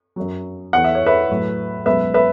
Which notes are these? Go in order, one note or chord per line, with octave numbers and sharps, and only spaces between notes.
F#2 F#3
E2 E3 F#5
E5
C#5
B4 E5
A2 F#3
C#2 B2 F#3 B4 E5
B4 E5